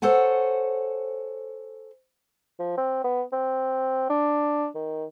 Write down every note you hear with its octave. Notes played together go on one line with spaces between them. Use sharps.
A4 C5 C#5 F#5 G#5
F3
C4
B3
C4
D4
D#3